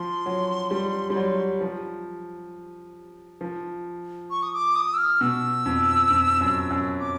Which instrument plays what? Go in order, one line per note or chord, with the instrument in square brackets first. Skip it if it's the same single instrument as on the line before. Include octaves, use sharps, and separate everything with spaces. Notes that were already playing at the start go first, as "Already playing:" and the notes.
Already playing: [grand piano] F3 [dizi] C6
[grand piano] F#3
G3
G3
F#3
F3
F3
[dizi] C#6
D#6
D6
D#6
E6
F6
[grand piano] B2 [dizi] E6
[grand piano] F2
F2
F#2
F#2
[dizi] D6